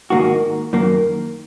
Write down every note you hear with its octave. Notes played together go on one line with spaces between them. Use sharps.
G#2 D#3 A#3 D#4 F#4
F#2 D#3 A#3